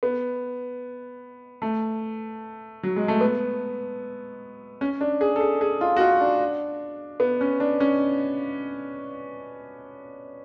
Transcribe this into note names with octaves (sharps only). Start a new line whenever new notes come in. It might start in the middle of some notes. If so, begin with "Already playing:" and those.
B3
A3
F#3
G#3
A3
B3
C#4
D4
G#4
A4
G#4
G#4
F4
F#4
F4
D4
B3
C#4
D4
C#4